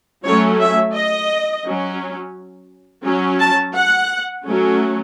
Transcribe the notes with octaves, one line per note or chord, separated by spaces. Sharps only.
F#3 A3 C#4 C#5
E5
D#5
F#3 C#4
F#3 C#4
A5
F#5
F#3 A3 C#4